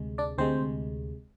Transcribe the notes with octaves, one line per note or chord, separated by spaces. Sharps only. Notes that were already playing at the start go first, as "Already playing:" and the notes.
Already playing: D2 C3 G#3
D4 D5
D2 C3 G#3 C4 C5